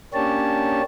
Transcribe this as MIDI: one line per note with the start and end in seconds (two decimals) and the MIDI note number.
0.14 0.82 58
0.14 0.82 61
0.14 0.82 62
0.14 0.82 67
0.14 0.82 73
0.14 0.82 81